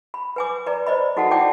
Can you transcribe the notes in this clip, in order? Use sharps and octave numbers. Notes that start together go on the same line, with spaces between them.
B5
B4 G#5 D6
B4 D5 A#5
C5 D5 D#5 B5
D#4 F#4 A4 F#5 A5
E4 D5 F#5 G5 A5 D6